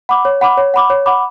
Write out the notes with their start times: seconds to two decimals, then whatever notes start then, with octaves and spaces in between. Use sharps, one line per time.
0.09 F#5 B5 D6
0.25 C#5
0.41 F#5 B5 D6
0.57 C#5
0.74 F#5 B5 D6
0.90 C#5
1.06 F#5 B5 D6